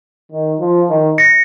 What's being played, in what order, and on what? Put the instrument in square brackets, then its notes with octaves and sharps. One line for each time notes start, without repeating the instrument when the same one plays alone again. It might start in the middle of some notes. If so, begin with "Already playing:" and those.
[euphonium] D#3
F3
D#3
[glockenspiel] A#6 C#7